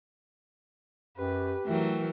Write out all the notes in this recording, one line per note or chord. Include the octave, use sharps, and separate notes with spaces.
F#2 G4 B4
E3 F#3 A3 A#4 G5